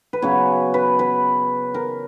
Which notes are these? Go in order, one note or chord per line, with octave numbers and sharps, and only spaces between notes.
B4
C#3 F#3 B3 C#5
B4
B4
A#4